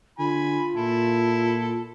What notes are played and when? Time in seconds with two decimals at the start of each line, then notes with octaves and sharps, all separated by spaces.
0.19 D3 F4 G#5 B5
0.76 A#2 E4 A4